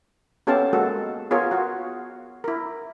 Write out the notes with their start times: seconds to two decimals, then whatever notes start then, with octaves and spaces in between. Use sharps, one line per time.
0.47 B3 C#4 G4 A4 F5 A5
0.73 G#3 A#3 F#4 A4
1.31 B3 F4 G#4 A#4 C#5
1.51 F#4 F5
2.44 E4 A#4